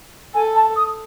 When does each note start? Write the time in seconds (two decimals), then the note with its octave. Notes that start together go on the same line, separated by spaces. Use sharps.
0.34 A4 G#5
0.55 A5
0.76 D#6